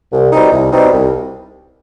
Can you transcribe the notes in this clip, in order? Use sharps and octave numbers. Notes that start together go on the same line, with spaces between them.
C2
B2 G3 C4 D#4
C2
B2 G3 C4 D#4
C2